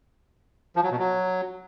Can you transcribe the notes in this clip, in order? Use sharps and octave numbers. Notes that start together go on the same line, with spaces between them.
F3
F#3
B2
F#3